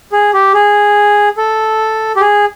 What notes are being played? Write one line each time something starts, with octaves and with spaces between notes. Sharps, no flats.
G#4
G4
G#4
A4
G4
G#4